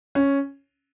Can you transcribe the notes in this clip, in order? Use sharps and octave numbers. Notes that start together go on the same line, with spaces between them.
C#4